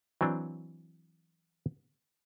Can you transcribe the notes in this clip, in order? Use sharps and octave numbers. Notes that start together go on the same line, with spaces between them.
E3 F#3 C4 D4